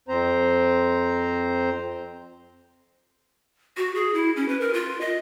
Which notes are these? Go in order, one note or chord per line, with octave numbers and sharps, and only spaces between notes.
F2 C4 C5 A#5
F#4
G#4
E4
C#4
B4
A#4
F4
D#5